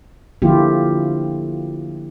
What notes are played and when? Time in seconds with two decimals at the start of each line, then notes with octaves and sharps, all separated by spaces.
0.42 D3 F3 A#3 E4 F4 G4